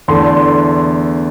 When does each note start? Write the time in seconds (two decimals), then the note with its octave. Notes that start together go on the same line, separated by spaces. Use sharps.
0.08 E2 D3 A3 C6
0.48 C6